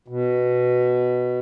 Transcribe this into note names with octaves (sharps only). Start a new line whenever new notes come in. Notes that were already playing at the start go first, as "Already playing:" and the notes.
B2